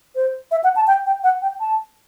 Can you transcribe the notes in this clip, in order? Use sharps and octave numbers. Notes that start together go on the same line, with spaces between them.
C5
E5
F#5
A5
G5
G5
F#5
G5
A5